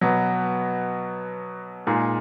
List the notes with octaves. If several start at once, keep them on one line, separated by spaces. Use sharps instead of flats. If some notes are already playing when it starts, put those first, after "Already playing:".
B2 F#3 B3
A#2 G#3 D#4 G#4